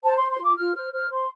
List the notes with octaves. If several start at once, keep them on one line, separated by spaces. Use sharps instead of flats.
C5 A5
C6
C5
C6
F4 D6
F4 F6
C5 F6
C5 F6
C5 C6